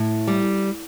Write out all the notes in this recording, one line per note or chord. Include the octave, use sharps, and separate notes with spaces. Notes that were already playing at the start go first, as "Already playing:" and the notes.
Already playing: A2
G3